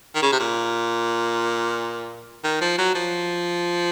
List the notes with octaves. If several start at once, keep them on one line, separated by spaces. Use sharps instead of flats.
D#3
C#3
C3
A#2
D#3
F3
F#3
F3